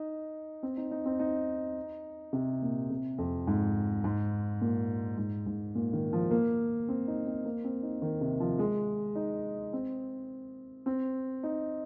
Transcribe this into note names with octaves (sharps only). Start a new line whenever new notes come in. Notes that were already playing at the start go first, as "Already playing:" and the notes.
Already playing: D#4
C4
D#4
D#4
C4
D#4
C3
A#2
C3
F2
G#2
G#2
A#2
G#2
G#2
A#2
D#3
F3
A#3
C4
D#4
C4
A#3
C4
D#4
D#3
C3
F3
G#3
D#4
C4
C4
D#4